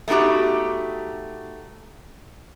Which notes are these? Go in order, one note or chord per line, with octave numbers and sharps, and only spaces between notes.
A3 B3 D#4 F#4 G4